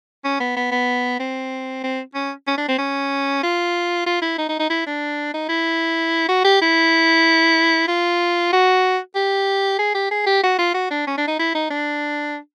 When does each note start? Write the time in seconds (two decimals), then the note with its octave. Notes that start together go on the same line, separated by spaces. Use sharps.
0.24 C#4
0.40 B3
0.56 B3
0.71 B3
1.19 C4
1.84 C4
2.15 C#4
2.47 C#4
2.58 D4
2.68 C4
2.78 C#4
3.43 F4
4.06 F4
4.22 E4
4.38 D#4
4.49 D#4
4.59 D#4
4.70 E4
4.86 D4
5.34 D#4
5.49 E4
6.29 F#4
6.44 G4
6.61 E4
7.88 F4
8.53 F#4
9.15 G4
9.79 G#4
9.95 G4
10.11 G#4
10.26 G4
10.43 F#4
10.59 F4
10.74 F#4
10.91 D4
11.07 C#4
11.17 D4
11.27 D#4
11.39 E4
11.55 D#4
11.70 D4